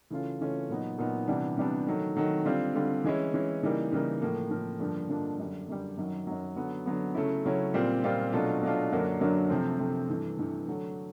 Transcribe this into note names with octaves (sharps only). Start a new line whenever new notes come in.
C#3 E3 A3 C#4 F4
C#3 E3 A3 C#4 F4
A#2 F#3 B3 D#4
A#2 F#3 B3 D#4
C3 E3 G3 B3 D4
C3 E3 G3 B3 D4
D#3 F#3 A3
D#3 F#3 A3
D3 G3 C4 F4
D3 G3 C4 F4
E3 G#3 C#4 E4
E3 G#3 C#4 E4
C#3 E3 G3 A#3 D#4
C#3 E3 G3 A#3 D#4
A2 F3 A#3
A2 F3 A#3
G2 D3 F3 A#3 D4
G2 D3 F3 A#3 D4
F#2 D3 G3
F#2 D3 G3
F#2 D#3 F#3
F#2 D#3 F#3
D3 F#3 B3
D3 F#3 B3
C#3 F#3 A3 C#4 E4
C#3 F#3 A3 C#4 E4
A#2 G3 C4 F4
A#2 G3 C4 F4
B2 F#3 A3 D4 F4
B2 F#3 A3 D4 F4
F#2 D3 F#3 A#3 D4
F#2 D3 F#3 A#3 D4
C3 F3 A3 C4
C3 F3 A3 C4
G2 E3 A3
G2 E3 A3
D3 F#3 A3